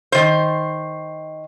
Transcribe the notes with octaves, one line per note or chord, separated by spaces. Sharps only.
D#3 C5